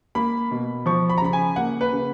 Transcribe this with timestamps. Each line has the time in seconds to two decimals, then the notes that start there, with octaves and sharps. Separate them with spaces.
0.15 A#3 B5
0.51 B2
0.86 F3 C#6
1.10 B5
1.18 A#5
1.21 C#3 B5
1.33 G#5
1.56 A#3 F#5
1.81 B4
1.92 C#3